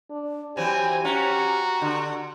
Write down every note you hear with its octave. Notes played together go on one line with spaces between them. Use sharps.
D4
E3 F#3 C4 G4 C5 G#5
C#4 F#4 A#5
D3